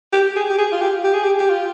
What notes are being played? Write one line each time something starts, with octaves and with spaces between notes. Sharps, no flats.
G4
G#4
G4
G#4
F4
G4
G4
G#4
G4
G4
F4